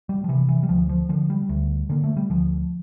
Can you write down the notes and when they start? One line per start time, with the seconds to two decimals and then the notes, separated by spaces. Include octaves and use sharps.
0.09 G3
0.24 F3
0.29 C3 E3
0.49 E3
0.63 G3
0.69 D2 F3
0.89 F3
1.09 D3 F3
1.30 G3
1.49 D2
1.89 D3 A#3
2.04 A3
2.17 G3
2.30 D2 F3